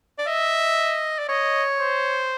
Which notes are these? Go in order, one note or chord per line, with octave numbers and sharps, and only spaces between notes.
D5
D#5 E5
D5
C#5 D#5
C5